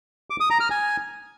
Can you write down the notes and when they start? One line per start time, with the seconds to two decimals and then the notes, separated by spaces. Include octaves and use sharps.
0.30 D6
0.40 D#6
0.50 A#5
0.60 F6
0.70 G#5